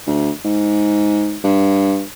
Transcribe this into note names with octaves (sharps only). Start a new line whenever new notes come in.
D2
G#2
G2